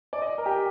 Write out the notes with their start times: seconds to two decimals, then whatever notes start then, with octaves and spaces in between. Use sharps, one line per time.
0.13 D5
0.22 D#5
0.38 A#4
0.46 G4